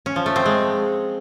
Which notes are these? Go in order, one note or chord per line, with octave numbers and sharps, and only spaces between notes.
C#4
F3
A3
C4
G#3